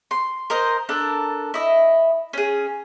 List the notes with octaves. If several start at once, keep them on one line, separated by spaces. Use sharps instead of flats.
C6
A#4 C5 D#5
D4 A4 A#4
E4 D#5
C#4 G#4